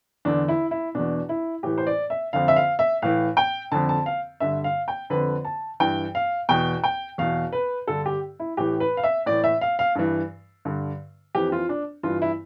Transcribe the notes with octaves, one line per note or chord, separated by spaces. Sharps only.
E2 D3 D4
E4
E4
E2 B2 D4
E4
A2 E3 G4
C5
D5
E5
F2 D3 F5
E5
F5
E5
A2 E3 F5
G5
F2 D3 A5
A5
F5
G2 D3 E5
F5
G5
F2 D3 B4
A5
G2 E3 G5
F5
E2 B2 G5
G5
E2 B2 F5
B4
G2 D3 A4
G4
E4
A2 E3 G4
B4
F5
E5
A2 E3 D5
E5
F5
F5
G2 E3
G2 D3
F2 E3 G4
F4
D4
G2 E3 F4
E4